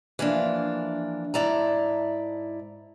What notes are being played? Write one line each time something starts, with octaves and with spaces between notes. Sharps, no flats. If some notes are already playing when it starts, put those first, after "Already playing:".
E3 F3 A#3 D4
G#2 E4 D5 A5 A#5